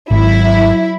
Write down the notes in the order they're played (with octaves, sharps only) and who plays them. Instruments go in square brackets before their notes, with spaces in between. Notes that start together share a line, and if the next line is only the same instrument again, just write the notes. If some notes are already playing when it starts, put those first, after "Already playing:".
[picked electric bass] G#1 [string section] F#3 E4